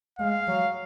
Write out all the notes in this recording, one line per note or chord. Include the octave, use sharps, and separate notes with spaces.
G#3 F5
F#3